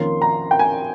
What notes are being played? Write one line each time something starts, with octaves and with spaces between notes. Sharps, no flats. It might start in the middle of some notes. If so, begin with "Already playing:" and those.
Already playing: F2 D#3 A#3 C#4 C6
A#5
G5
G#5